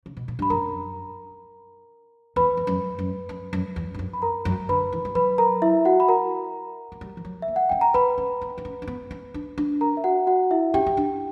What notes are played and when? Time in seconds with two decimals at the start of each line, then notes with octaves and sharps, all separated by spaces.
0.06 C#3
0.17 B2
0.28 A#2
0.39 G2 B5
0.50 F#2 A#4 A#5
2.36 E2 B4 B5
2.57 E2
2.67 F#2
2.99 F#2
3.29 F#2
3.53 F#2
3.76 E2
3.94 G2
3.99 F#2
4.13 B5
4.22 A#4 A#5
4.45 F#2
4.69 D3 B4 B5
4.92 E3
5.05 G3
5.15 F#3 B4 B5
5.38 A#4 A#5
5.62 E4 E5
5.85 F#4 F#5
6.00 B5
6.08 A#4 A#5
6.92 A#3
7.01 G3
7.17 E3
7.25 F#3
7.42 E5
7.48 A#3
7.56 F#5
7.69 C#4 G5
7.81 A#5
7.94 B3 B4 B5
8.18 C#4
8.41 B3
8.58 B3
8.65 C#4
8.82 C#4
8.88 B3
9.11 C#4
9.34 D4
9.58 D4
9.81 A#4 A#5
9.97 E5
10.04 F#4 F#5
10.27 F#4 F#5
10.51 E4 E5
10.74 C#4 G4 G5
10.86 C#4
10.97 D4